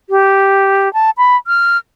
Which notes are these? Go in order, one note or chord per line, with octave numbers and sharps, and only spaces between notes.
G4
A5
B5
F6